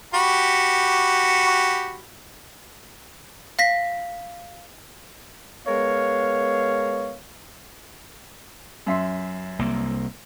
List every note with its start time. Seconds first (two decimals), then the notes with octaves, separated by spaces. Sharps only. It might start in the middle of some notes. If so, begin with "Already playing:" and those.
0.14 F#4 G4 B5
3.59 F5 A#6 B6
5.67 G#3 B3 A#4 C#5 F5
8.86 F#2 E5 C6
9.59 C2 A#3